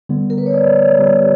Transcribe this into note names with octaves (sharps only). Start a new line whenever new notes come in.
D3 G3 B3
A#4
B4
C#5
D5
C#5
D3 G3 B3 G4